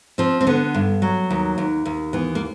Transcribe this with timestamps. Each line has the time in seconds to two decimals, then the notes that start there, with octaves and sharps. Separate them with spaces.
0.18 F3 C4
0.41 C4
0.47 D3 B3
0.74 G2
1.02 F#3
1.30 D#2
1.58 D#2
1.85 D#2
2.13 E3 B3
2.35 A#3